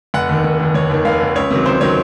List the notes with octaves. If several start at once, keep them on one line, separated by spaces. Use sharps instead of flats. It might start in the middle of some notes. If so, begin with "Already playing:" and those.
F1 F#5
D#2 D#3
F1
D#2 D#3
F1 C#5
D#2 D#3
F1 F5
D#2 D#3
C#2 C#5
C3 D#3 F#3
C#2 C5
C3 D#3 F#3 C#5